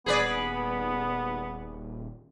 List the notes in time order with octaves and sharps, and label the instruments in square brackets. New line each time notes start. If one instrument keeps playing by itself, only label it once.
[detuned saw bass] D#1 [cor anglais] B3 [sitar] G#4 B4 D5